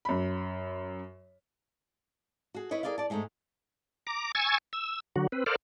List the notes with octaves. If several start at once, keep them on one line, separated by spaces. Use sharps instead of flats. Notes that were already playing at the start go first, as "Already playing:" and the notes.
F#2 B5
F#4 G#4
E4 B4 C#5 D#5
G#4 A#4 D5 D#5 F5
D5 A5
G#2 G#3 A3 C#4 D#4
A#5 D6
G#5 C#6 E6 G#6 A6
E6
D3 F#3 F#4
C4 B4
A4 A#4 C5 D5 F5